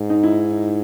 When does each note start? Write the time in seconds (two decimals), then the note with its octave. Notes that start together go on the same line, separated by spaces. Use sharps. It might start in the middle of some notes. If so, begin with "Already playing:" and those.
Already playing: G#2
0.10 D#4
0.23 E4